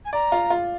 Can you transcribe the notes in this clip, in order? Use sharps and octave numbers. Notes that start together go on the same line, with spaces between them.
G#5
D5 A#5
F4
F4